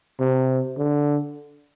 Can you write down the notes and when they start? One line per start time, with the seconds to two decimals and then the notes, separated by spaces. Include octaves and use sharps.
0.20 C3
0.78 D3